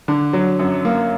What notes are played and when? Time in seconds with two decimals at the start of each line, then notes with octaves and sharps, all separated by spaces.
0.08 D3
0.33 F#3
0.59 F#2
0.85 A#3